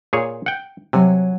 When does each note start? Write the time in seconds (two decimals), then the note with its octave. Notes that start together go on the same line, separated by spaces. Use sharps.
0.13 A#2 G#4 C#5
0.46 F#5 G5
0.93 C3 F#3 F#5 G#5